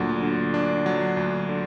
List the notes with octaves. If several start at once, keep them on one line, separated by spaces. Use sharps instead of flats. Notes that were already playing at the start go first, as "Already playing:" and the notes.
Already playing: D2 A#2 F#3 D4
D3
D4
F#3
D2
D3